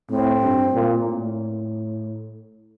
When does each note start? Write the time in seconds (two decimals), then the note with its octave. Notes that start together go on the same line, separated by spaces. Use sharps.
0.10 A2 C4
0.41 G2
0.74 A#2
1.05 A2